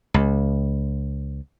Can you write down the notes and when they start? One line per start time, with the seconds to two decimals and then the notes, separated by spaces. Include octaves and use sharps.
0.14 C#2